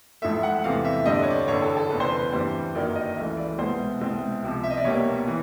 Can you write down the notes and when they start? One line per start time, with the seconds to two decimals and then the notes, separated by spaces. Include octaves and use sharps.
0.22 A1 G#2 F3 A3 E5
0.43 F#5
0.64 E2 C3 E3 A3 C4 F5
0.85 E5
1.06 G2 D3 G3 C4 D#5
1.14 D5
1.23 C#5
1.30 D5
1.48 A1 G2 D3 C#5
1.62 A4
1.77 A4
1.90 F1 E2 C#3 B4
2.00 C5
2.10 B4
2.32 G2 E3 G3 C4 C5
2.75 G1 F#2 D#3 F#3 A#3 D5
2.95 D#5
3.16 C#2 C#3 E3 A3 E5
3.37 D5
3.58 C2 B2 G#3 B3 C5
4.01 C2 B2 G#3 C4
4.42 C#2 C3 F3
4.63 E5
4.70 D#5
4.77 D5
4.84 B1 B2 G3 A#3 C#5
5.28 E3